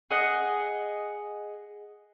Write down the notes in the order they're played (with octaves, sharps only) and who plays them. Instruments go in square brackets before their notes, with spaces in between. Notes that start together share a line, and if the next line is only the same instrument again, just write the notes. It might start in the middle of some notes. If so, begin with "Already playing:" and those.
[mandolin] G#4 D#5 F#5